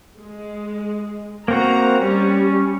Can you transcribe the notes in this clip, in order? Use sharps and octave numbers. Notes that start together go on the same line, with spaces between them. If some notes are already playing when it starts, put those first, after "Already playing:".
G#3
A#3 C4 F#4 A#5
G3 C#4